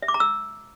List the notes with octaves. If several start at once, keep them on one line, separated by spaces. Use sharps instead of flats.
E5
D6
A#5
E6